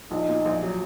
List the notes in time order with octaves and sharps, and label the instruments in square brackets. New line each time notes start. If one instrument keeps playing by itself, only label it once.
[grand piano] A#1 [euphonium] D#4
[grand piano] A#2
A#1
F#3